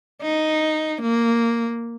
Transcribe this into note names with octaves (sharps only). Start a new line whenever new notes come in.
D#4
A#3